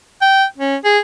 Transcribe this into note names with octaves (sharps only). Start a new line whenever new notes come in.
G5
C#4
G#4